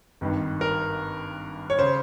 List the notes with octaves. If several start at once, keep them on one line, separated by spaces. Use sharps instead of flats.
G#1 G2 D#3
A#4
C#5
C#3 C5